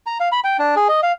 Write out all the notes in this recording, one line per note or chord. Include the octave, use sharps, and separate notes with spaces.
A#5
F5
B5
G5
D4
G#4
D#5
F5